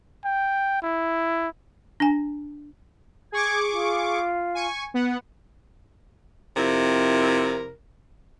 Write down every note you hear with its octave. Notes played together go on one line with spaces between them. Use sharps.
G5
E4
D4 G#5
G#4 C#6 D6 G#6
F4
G#5 C#6
B3 F#5
F2 C3 E4 A#4